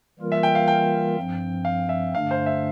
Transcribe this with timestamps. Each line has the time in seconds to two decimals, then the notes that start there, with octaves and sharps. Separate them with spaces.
0.19 E3 G3 A#3 F4 A#4
0.32 E5
0.43 G5
0.55 F5
0.68 G5
1.17 G2 F3 C4
1.65 F5
1.89 E5
2.14 G2 D3 A3 D4 F5
2.31 C5
2.46 E5